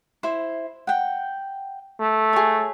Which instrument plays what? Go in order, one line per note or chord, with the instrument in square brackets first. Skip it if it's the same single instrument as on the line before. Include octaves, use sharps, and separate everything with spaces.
[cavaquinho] E4 C5
F#5 G5
[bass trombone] A3
[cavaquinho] G#4 C#5